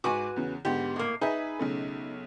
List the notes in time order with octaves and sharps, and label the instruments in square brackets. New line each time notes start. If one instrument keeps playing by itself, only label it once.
[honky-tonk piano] G#2 D6 [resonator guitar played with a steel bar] F#4 B4 G#5
[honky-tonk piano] E2 C#3
[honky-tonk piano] G#2 D3 B3 [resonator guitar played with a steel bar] G4
[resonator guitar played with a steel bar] A2 A#3
[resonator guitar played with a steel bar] D#4 E5 [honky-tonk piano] G#4 B4
[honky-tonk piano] B1 C#3 A3